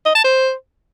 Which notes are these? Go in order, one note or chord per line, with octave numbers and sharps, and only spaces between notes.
D#5
A5
C5